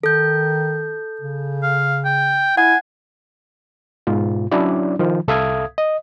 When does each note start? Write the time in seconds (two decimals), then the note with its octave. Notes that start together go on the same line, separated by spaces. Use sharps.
0.03 D#3 A4 G6
1.21 C#3
1.63 F5
2.05 G5
2.57 E4 F#5 G#5
4.07 G#2 B2 F4
4.52 F#3 C#4 D4 E4 D5
4.99 D#3 F3
5.28 C2 A4 E5 F5 D#6 G#6
5.78 D#5